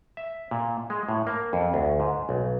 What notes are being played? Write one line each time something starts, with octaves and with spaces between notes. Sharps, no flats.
E5
A#2
G#3
A2
A#3
F2
D2
G#2
B1